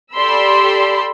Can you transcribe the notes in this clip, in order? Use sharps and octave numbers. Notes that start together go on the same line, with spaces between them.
G4 A4 D5 B5 C6 E6